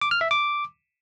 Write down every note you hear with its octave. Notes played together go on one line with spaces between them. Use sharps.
D6
F6
E5
D6